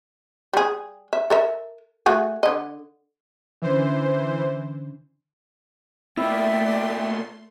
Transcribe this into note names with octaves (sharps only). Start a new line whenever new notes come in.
G3 G#4
E5
A4 A#4 E5
A3 F#4 G#4
D3 D#5
D3 E3 C#4 D4 C5
B2 A3 A#3 E4 D5 E5 G5 C6